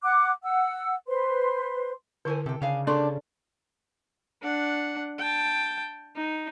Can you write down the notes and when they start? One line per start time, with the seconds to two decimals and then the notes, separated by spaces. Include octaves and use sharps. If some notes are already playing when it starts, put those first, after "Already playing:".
0.03 F#5 D6 F#6
0.43 F#5 E6
1.08 B4 C5 C6
2.25 D3 E4 A4 A#4 C5 G#5
2.46 C3 A4 G5
2.62 C#3 D4 F5 G#5
2.87 C4 D4 G4 A4 A#4 C6 C#6
4.42 D4 F#5
5.18 G5 A5
6.16 D#4